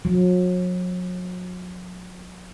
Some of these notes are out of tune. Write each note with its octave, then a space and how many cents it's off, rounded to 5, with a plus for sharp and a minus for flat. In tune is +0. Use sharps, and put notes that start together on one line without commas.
F#3 -40